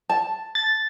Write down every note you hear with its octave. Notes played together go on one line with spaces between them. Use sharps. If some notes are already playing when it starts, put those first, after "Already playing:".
A5
A6